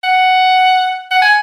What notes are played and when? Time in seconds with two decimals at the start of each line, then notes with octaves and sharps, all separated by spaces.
0.03 F#5
1.11 F#5
1.22 G#5